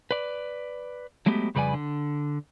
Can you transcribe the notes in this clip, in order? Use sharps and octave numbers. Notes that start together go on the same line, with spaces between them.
B4 D5
F#3 G#3 A3 B3 G4
F2 C#3 G3 B4 D5 G#5
D3